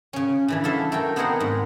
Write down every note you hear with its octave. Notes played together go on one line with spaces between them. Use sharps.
C#3 C#4
C#3 E3 D4
E4 F#4 A4 E5 F5
A3 A#4 G5
B3 C4 D#4 G#4 A#4 F#5
G#2